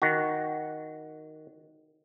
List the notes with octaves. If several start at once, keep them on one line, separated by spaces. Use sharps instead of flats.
D#3 F#4